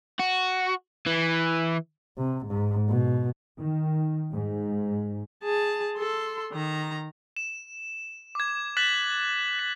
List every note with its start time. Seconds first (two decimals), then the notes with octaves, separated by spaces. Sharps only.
0.20 F#4
1.07 E3
2.18 C3
2.46 G#2
2.89 B2
3.57 D#3
4.31 G#2
5.44 G#4 A5
5.98 A4 C6
6.53 D#3 A#5
7.37 E7
8.35 D6 G#6
8.77 F#6 A6 B6 E7 F#7
9.59 B6